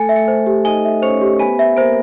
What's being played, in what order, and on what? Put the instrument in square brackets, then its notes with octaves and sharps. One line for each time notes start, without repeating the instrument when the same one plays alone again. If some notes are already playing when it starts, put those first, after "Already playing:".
Already playing: [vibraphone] A3 A4 [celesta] G#5
[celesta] E5
[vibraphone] A3 A4
[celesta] C5
G4
[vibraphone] D#4 D#5 [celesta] G#5
[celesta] E5
[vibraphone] C#4 C#5 [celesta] C5
[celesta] G4
[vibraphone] B3 B4 [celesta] G#5
[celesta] E5
[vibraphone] A#3 A#4 [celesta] C5